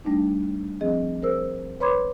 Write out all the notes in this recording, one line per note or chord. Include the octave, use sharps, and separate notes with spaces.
G3 A3 D4 D#4
F3 C4 G#4 D#5
G#4 A#4 C5 E6
B4 C#5 B5 C6 D6 G#6